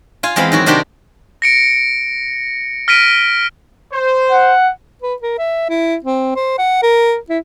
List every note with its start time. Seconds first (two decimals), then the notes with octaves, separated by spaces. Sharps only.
0.23 F4 F5 G#5
0.36 E2 G#3 C4 F5 B5
0.52 D#3 F#3 F#4
0.66 C3 D#3 D4 F#4 G4 C6
1.42 A#6 C#7 D7
2.88 F6 A#6 B6 D7 D#7
3.93 C5
4.32 F#5
5.02 B4
5.22 A#4
5.38 E5
5.69 E4
6.04 C4
6.36 C5
6.58 F#5
6.82 A#4
7.29 E4